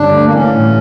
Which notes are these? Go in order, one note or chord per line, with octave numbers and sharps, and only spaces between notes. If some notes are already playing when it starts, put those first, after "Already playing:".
Already playing: G2 D3 G3 C#4 D4
A3
A#3
E3 C#4
A2